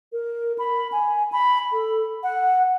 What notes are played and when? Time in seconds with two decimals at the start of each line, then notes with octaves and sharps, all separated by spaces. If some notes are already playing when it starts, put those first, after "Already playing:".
0.13 A#4
0.59 B5
0.92 G#5
1.32 B5
1.72 A4
2.23 F#5